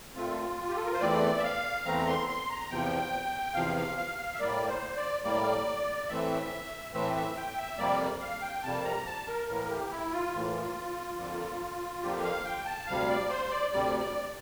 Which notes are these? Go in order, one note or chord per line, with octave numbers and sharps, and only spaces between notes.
A#2 A3 C4 F4
G4
A4
A#4
C5
E2 E3 A3 C4 D5
E5
F5
E2 E3 A3 C4 A#5
C6
C6
A#5
E2 C3 F3 G5
E2 C3 F3 F5
F5
F5
F5
E5
A2 G3 A#3 D5
C5
D5
A2 G3 A#3 D5
A2 E3 A3 C4 E5
A2 E3 A3 C4 E5
E5
G5
E5
F2 C3 G3 A#3 D5
F5
G5
F2 C3 G3 A#3 A5
A#5
A5
A#4
A2 E3 A#3 A#4
G4
E4
F4
A2 E3 A#3
F2 D3 F3 A#3
F2 D3 F3 A#3 G4
F5
G5
A5
D2 C3 G3 F5
D5
C5
D5
D2 C3 G3 D5
D5